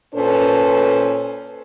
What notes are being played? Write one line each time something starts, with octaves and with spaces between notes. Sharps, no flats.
A#2 C#4 A4 B4 C5